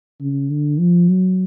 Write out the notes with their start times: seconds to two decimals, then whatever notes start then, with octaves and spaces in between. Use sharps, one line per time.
0.20 C#3
0.50 D3
0.79 F3
1.09 F#3